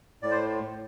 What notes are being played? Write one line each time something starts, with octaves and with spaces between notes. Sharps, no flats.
A2 D5
C5